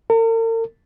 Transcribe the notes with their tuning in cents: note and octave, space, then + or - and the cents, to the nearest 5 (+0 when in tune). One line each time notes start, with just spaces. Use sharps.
A#4 -45